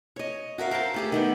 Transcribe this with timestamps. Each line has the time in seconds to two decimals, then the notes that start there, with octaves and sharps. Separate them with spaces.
0.16 C#5 D#5
0.58 F#4 A#4 E5 F5
0.71 A#4 C5 G5 A5
0.94 A3 G4 G#4
1.12 D#3 A3 B3